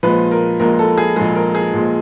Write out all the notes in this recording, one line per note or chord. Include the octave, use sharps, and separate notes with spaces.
A#1 A#2 F3 G#3 B4
A#4
A#1 A#2 F3 G#3 A#4
A4
G#4
A#1 A#2 F3 G#3 G#4
A#4
G#4
A#1 A#2 F3 G#3